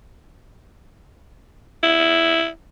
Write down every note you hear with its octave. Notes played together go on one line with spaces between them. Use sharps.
E4